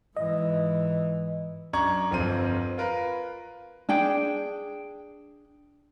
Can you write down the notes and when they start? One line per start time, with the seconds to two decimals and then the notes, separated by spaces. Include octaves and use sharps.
0.17 G#2 E3 D#5
1.73 F#2 D4 A#5 C#6 G#6
2.11 G1 F2 C4 C6 D#7
2.78 F4 A#4 B4
3.89 D4 G#4 G5